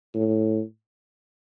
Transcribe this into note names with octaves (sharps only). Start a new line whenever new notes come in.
A2